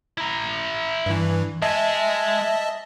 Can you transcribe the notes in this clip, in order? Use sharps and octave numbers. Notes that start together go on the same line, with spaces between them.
E4 A#5
G2 E3
G#3 D#5 E5 G#5 A5